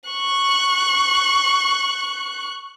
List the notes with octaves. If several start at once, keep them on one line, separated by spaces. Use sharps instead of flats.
C#6 F#6